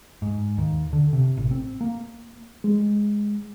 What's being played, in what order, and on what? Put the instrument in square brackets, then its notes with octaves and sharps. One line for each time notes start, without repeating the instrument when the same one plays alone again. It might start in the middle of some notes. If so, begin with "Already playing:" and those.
[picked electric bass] G#2
D#2
D3
C3
A1
C4
A#3
[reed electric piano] G#3